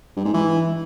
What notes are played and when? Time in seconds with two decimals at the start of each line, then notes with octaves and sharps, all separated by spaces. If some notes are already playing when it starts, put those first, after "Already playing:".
0.16 G2
0.25 G#2
0.34 E3